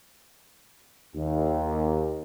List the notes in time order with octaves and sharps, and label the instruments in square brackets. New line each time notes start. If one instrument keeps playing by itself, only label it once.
[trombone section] D#2